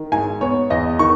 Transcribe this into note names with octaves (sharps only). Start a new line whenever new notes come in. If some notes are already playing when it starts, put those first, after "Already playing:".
Already playing: D#3
G#2 G#5
B3 C#5
E2 D#5
D#3 C#6